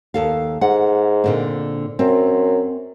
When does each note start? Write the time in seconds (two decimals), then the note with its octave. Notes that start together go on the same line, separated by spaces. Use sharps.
0.14 D#2 A4 F5
0.61 G#2 F#5
1.24 A#2 D3 C4
1.99 F#2 C4